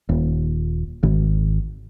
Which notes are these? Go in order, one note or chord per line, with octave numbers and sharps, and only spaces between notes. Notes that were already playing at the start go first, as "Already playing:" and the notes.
D#1
G#1